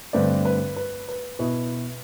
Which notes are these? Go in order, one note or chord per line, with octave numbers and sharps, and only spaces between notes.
G2 D3 A3 C4 B4 D5
B4
B4
B4
B2 B3 E4